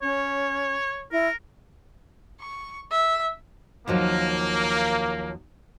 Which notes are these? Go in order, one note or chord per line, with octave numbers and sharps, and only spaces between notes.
C#4 C#5
E4 A#4
C#6
E5
D#2 F3 F#3 A#3